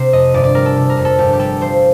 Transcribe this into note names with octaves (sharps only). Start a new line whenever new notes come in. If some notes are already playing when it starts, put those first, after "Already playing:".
Already playing: C3 C5
F2 D#5
G1 D5
D5
G3 A#4
A4
C3
A#4
F2
A4
G1 G4
G4
G3 A4
F3 C5